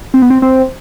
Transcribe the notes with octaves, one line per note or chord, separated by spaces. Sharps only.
C4
B3
C4
C4